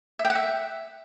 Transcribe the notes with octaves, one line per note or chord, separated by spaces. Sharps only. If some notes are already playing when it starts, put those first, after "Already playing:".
E5
G5
F#5
E5